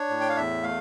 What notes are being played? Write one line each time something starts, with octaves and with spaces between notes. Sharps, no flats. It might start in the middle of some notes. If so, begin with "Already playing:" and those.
Already playing: D4 C#5
A2
G5
F5
E2 E5
A3 F5